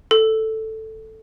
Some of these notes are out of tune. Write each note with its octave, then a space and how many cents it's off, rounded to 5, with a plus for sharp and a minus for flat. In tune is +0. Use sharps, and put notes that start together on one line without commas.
A4 +0